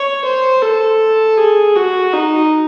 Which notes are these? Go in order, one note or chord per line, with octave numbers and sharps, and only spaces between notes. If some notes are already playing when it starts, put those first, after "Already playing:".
Already playing: C#5
C5
A4
G#4
F#4
D#4